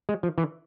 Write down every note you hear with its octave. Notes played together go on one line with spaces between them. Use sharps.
G#3
F3
E3